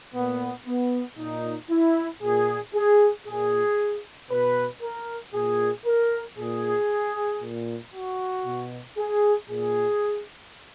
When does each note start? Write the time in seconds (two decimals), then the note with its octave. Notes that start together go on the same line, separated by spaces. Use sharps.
0.15 A#2 B3
0.66 B3
1.19 A#2 D#4
1.70 E4
2.23 A#2 G#4
2.74 G#4
3.27 A#2 G#4
4.31 B2 B4
4.82 A#4
5.34 A#2 G#4
5.86 A#4
6.38 A#2 G#4
7.42 A#2
7.95 F#4
8.46 B2
8.98 G#4
9.50 A#2 G#4